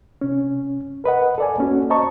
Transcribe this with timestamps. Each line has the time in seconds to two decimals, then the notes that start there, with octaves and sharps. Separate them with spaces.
0.21 C3 C#4
1.04 A#4 B4 D#5 F#5
1.38 A4 D5 G#5
1.58 A#3 C#4 F#4
1.90 C5 D#5 A5 A#5 C#6